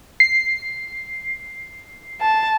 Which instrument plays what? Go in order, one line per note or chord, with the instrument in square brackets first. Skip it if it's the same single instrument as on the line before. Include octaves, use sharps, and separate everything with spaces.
[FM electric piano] C7
[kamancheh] A5